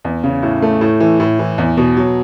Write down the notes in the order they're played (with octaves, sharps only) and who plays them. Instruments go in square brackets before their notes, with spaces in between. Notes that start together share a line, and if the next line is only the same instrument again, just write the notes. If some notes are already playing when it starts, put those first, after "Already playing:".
[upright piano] E2
C#3
A2
A3
A2
E3
A2
E3
E2
B2
F#3